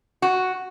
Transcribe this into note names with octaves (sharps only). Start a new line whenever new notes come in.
F#4